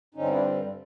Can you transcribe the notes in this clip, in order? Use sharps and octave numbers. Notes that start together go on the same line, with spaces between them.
G2 D3 G3 C4 C#4 D#4
D4 E4